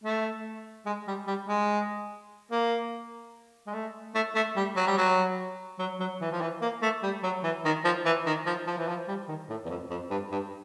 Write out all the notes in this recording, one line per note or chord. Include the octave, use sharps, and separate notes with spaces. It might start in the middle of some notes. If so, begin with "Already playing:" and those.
A3
G#3
G3
G3
G#3
A#3
G#3
A3
A3
A3
G3
F#3
G3
F#3
F#3
F#3
E3
F3
E3
A#3
A3
G3
F#3
E3
D#3
F3
E3
D#3
F3
F3
E3
F3
G3
D#3
A2
E2
F2
F2
G2
G2